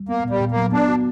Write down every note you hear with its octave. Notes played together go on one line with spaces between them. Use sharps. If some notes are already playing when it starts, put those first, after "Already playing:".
Already playing: G3
A#3 B3
A#2
G3
A#2
A#3
F#3
B3 D4
F#4